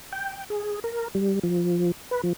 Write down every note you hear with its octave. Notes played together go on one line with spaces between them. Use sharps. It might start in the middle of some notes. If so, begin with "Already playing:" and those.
G5
G#4
A#4
G3
F3
B4
F3